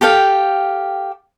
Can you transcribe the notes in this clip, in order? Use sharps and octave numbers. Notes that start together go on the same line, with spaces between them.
G4 A4 F5 G5